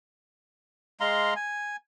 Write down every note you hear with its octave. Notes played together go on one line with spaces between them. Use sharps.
G#3 F5 A#5 C6
G#5